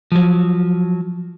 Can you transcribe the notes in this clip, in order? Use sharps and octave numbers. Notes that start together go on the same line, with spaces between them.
F3 F#3